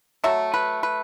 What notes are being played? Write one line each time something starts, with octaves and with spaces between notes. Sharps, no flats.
F#3 A3 E5
B4
B4